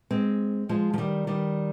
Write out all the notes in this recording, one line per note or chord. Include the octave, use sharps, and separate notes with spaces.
G#3 C4
F3 G#3
F3
D#3 G3
D#3 G3